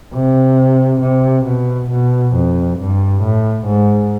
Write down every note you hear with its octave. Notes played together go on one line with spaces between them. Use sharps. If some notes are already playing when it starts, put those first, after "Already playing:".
C3
C3
B2
B2
F2
G2
A2
G#2